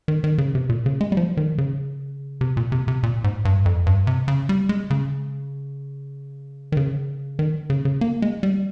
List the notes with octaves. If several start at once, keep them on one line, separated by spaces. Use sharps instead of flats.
D#3
D#3
C#3
C3
A#2
C#3
G#3
G3
F3
D#3
C#3
C3
A#2
C3
C3
A#2
G#2
G2
F2
G2
C3
C#3
G3
G#3
C#3
D#3
C#3
D#3
C#3
C#3
A#3
G#3
G3